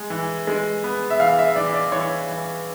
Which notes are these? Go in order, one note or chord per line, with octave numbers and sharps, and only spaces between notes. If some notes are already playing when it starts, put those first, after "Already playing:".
Already playing: G#3
E3
G#3
B3
E5
E3 F5
E5
E3 D5
D5
E3 C#5
E3